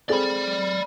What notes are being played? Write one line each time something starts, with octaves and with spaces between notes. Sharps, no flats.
C4 G#4 A4 D5 B5